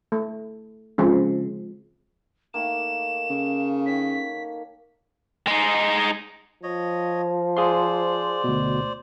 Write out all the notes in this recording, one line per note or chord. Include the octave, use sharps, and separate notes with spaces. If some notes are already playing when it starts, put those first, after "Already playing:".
A3
C#3 F3 G#3 C4
D#3 A3 A#3 E7
C#3
D#3 C#5 B6
G#3 D#4
F3 C#5 D#5
G#4 C5 D5 F5 C6
D2 B2